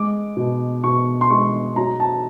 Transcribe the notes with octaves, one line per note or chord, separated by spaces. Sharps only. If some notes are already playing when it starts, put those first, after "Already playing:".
Already playing: G#3 D6
B2
B2 C#6
C6
G#3 C#6
F#3 A#5
A5